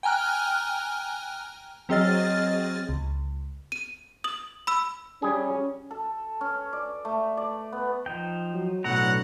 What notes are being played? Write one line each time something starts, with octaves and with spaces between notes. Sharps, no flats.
G5 G#5 A#5 F6 F#6
F#3 C4 G#4 D#5 F6 A6
C#2
D#7
D#6 F#7
B5 E6
G3 C#4 G#4
A4
C#4
D5
A3
D5
B3
F3 D#4 G5
F#3
B1 A2 D3 F#3 F#5 A#5